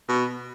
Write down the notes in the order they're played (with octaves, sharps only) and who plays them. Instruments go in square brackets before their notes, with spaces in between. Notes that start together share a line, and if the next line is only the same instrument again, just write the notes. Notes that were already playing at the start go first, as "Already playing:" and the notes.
[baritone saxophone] B2